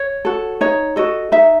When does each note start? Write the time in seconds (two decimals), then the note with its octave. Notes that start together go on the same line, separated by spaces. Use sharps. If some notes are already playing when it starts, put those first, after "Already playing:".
Already playing: C#5
0.25 F#4 A4
0.61 D#4 C#5
0.96 F#4 A4 D#5
1.32 D#4 E5